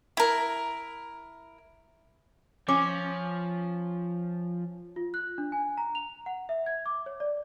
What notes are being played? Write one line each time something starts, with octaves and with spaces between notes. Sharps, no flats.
E4 A#4
F3 C#4 D6
F4
F#6
D4
G#5
A#5
F7
F#5
E5
G#6
D6
C#5
D5